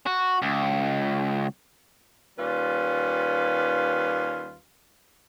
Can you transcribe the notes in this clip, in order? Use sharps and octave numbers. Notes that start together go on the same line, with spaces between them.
F#4
C#2
D#2 G3 C#4 F4 B4